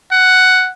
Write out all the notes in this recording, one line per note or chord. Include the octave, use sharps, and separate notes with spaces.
F#5